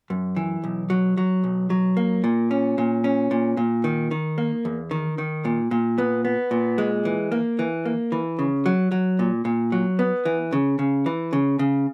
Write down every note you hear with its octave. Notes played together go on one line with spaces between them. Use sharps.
F#2
E3
B1
F#3
F#3
B1
F#3
A#3
A#2
C#4
A#2
C#4
A#2
A#2
D#3
D#3
A#3
E2
D#3
D#3
A#2
A#2
B3
B3
A#2
G#3
E3
A#3
E3
A#3
E3
C#3
F#3
F#3
A#2
A#2
F#3
B3
E3
C#3
C#3
E3
C#3
C#3